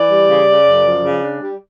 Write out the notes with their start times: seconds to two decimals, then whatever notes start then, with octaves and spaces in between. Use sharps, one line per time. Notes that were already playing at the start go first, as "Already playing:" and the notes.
Already playing: E3 D5
0.09 G3
0.29 C#3
0.47 C#3
0.66 F#2
0.85 F3
1.03 C#3
1.22 D4
1.41 G3